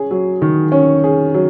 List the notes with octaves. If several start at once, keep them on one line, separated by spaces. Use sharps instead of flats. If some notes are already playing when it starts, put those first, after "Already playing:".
Already playing: C#4 G#4
F#3
D#3
C#4
G#4
F#3